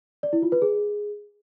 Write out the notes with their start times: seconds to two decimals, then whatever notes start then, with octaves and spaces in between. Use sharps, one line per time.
0.23 D5
0.33 E4
0.42 F4
0.52 B4
0.62 G#4